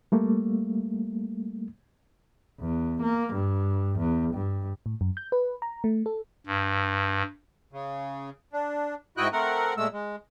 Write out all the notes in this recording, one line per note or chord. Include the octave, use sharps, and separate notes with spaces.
G3 A3 A#3
E2
A#3
G2
E2
G2
A2
F#2
G6
B4
A#5
A3
A4
G2
C#3
D4
G#2 E4 F#4 D#5 G5 F#6
A3 C4 A#4 F#5
A#2 G#3 A3 E6
G#3